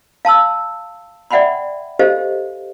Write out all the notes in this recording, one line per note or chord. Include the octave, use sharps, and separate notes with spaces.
F5 A5 C6 E6
D5 E5 F#5 G5 B5 C6
G4 A4 C5 D#5 F5